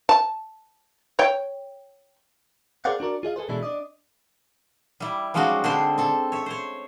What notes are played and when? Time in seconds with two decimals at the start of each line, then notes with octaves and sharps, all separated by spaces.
0.09 A5
1.19 C#5 G5
2.85 G#4 A#4 C5 D5 F5 F#5
3.00 D4 F#4 A#4 D5
3.23 F4 G#4 D#5 F5
3.36 G#4 A4 B4 C5
3.49 B2 E3 G#3 D4 E4 A4
3.63 D4 D5 D#5
5.00 G3 E4
5.34 F3 G3 G#3 C#4 D#4 F#4
5.64 D3 G3 G#3 C4 C5
5.98 C4 A4
6.32 C#5 E5
6.46 C5 C#5